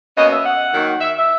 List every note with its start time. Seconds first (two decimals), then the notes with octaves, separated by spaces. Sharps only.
0.16 B2 A#3 C#4 D#5
0.31 E5
0.45 F#5
0.73 D#3 F#3 A#3 D#4
1.01 E5
1.15 E5